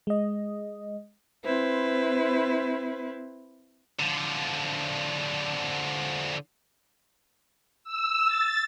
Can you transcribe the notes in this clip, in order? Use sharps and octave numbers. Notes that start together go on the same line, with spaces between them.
G#3 D#5
C4 E4 B4 C5
D3 F3
E6
A6